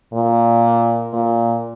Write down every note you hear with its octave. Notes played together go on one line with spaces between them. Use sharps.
A#2
A#2